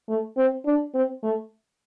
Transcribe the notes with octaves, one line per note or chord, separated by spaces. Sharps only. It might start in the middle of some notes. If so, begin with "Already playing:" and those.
A3
C4
D4
C4
A3